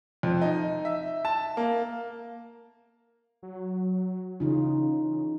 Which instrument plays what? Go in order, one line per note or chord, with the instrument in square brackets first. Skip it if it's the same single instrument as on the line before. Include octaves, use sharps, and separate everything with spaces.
[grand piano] F2
D#4
E5
A5
A#3
[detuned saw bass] F#3
[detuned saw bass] C#3 [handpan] E3 D#4 F4